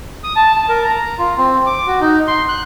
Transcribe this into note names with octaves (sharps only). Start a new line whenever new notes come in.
D#6
A5
A5
A#4
A#5
F4
C4
D6
F#4
D#4
C6
F#6